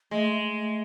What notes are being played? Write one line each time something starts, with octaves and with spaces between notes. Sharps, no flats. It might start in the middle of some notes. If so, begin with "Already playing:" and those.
G#3 A3
A3
A3